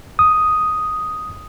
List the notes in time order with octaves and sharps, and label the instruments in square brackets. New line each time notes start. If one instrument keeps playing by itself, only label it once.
[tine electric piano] D#6